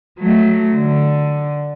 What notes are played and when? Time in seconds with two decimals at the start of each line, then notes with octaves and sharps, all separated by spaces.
0.19 F#3 A3
0.75 D3